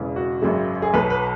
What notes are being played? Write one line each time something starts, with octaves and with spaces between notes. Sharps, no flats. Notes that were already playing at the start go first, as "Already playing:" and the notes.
Already playing: E1 E2 C#3
F#4
G#1 F#2 C#3 G#3
G#4
B1 B2 F#3 B4
B4